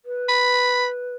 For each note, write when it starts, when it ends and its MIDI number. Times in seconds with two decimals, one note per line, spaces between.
0.05 1.15 71
0.29 0.87 83